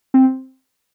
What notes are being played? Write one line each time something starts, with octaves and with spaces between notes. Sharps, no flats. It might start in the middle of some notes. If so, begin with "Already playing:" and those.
C4